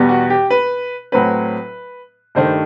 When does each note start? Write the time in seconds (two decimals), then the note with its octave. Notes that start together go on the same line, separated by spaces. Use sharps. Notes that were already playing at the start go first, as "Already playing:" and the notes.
Already playing: E2 B2 G3 B3
0.09 F#4
0.30 G4
0.50 B4
1.12 A2 F#3 C4 B4
2.35 G2 D#3 A3 C5